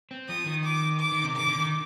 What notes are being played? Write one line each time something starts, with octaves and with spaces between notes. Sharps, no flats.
C4
F3 D#6
D#3
D6
D6
D#3
C3
D#3 D6
D3
D#3